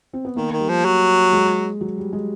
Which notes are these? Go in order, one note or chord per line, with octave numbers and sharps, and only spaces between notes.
C4
B3
D#3 A#3
D#3
G3
F3
F#3
G#3
F#3
G3
G#3